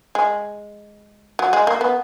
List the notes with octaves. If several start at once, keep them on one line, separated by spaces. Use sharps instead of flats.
G#3
F#3
G#3
A#3
B3